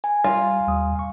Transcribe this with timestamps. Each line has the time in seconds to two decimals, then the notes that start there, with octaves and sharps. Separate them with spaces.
0.04 G#5
0.24 G3 F4
0.67 D#2 G3 D#6
0.96 F5 C#6